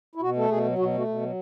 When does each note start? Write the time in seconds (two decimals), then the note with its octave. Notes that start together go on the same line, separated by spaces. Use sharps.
0.15 E4
0.22 B2 F#4
0.36 A3 A4
0.50 B2 G#4
0.65 F#3
0.78 B2 F#4
0.93 A3 F#4
1.08 B2
1.21 F#3